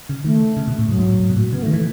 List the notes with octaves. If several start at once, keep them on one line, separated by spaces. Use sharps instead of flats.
C#3
D#3 A3
C#3
B2
A2
G#2 F#3
G#2
A2
G#2
B2
A2
C#3 B3
A3
D#3
E3 A3